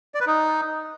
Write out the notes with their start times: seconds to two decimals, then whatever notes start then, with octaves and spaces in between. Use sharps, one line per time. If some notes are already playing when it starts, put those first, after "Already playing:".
0.14 D5
0.21 B4
0.27 D#4